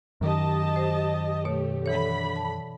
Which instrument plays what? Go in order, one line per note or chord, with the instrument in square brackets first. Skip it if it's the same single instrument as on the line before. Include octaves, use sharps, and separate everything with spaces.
[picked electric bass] F#2 D#3 [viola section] G4 D#5 A5
[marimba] C5
[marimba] B2 C#5 [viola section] A3 G4
[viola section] D3 B5 [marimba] E3 C#5
[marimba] A5